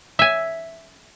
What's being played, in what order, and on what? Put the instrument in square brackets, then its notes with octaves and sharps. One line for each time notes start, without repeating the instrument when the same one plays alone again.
[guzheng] E5 G#5